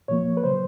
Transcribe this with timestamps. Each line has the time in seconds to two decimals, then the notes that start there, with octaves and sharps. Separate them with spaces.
0.08 A#2 F3 A#3 C#5
0.37 B4
0.43 C#3 F#3 C5